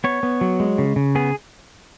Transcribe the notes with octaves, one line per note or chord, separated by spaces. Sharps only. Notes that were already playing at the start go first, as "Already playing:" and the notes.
B3 C#5
B3
F#3
G#3
C#3
C#3
B3 G#4